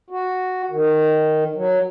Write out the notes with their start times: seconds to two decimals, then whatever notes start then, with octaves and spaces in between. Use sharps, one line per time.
0.10 F#4
0.71 D#3
1.55 F#3